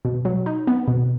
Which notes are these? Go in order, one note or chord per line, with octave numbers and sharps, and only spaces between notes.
B2
F#3
D#4
B3
B2